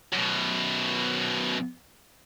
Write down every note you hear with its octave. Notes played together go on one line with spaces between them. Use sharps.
F#2 B2